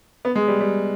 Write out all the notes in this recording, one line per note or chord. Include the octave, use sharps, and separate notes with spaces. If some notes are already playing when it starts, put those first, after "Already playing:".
B3
G#3
G3
G3